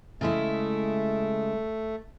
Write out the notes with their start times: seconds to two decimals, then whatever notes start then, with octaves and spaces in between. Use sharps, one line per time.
0.21 C#3 G#3 A3 E4